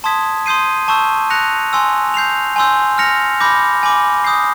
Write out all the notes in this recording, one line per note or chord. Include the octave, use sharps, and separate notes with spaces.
A5 C6 D#6 G#6 B6
C6 D#6 G6 C7 D#7
A5 C#6 E6 G6
F#6 A#6 C#7 F7
G#5 C6 E6
G6 C7 F7
G#5 C6 E6 G6
F6 A#6 C#7 F7
B5 D6 G6 A#6
G#5 B5 D6
D#6 G6 C7